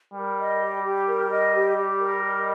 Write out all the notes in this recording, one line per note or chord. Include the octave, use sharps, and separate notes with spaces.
G3 A#4
D#5
G4
G4
A#4
D#5
G4
G4
A#4
D#5